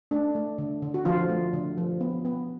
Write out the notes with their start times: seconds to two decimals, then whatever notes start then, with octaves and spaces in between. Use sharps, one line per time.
0.11 A3 D4
0.35 A3
0.58 D3
0.82 D3
0.94 F#4
1.05 D3 F3 F4
1.29 A3
1.53 D3
1.78 F3
2.01 B3
2.25 B3